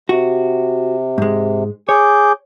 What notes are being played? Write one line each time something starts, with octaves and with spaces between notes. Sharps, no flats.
C3 F#4
G#2 G#3
G#4 C#5 D6 G6